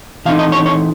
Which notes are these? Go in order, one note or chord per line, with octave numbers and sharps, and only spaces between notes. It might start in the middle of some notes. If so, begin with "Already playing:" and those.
E3 A3 C4 D#4 F5
D#5
C#5
C#5